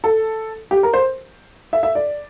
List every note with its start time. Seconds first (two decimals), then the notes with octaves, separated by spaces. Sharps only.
0.04 A4
0.71 G4
0.83 A#4
0.94 C5
1.73 E5
1.83 E5
1.95 D5